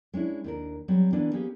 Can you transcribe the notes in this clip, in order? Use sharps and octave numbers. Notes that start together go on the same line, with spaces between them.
G#3 C#4 D4 E4
D#2 D4 A#4
F#3 G3 C4
E3 A#3 B3 D4
A#3 B3 C#4 G4 G#4